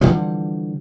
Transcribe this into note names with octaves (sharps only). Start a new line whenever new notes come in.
D3 E3 F3 G3